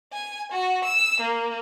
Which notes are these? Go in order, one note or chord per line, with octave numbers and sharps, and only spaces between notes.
G#5
F#4
E6
A#3